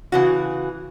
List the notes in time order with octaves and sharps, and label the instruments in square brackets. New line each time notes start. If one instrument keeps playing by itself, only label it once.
[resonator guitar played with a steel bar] C#3 E3 F#4